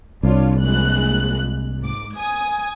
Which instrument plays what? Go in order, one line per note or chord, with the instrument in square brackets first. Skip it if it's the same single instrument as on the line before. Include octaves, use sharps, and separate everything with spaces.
[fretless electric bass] C2 [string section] D4 F4 C#5
[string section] A#1 G#3 F#6
G#2 D6
G#5 D#6 G#6